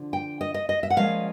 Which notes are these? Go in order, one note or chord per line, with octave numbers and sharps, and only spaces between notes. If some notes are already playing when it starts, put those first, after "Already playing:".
Already playing: D3 F3
G5
D#5
D#5
D#5
E5
F#5
A#2 F3 G#3 C#4 F5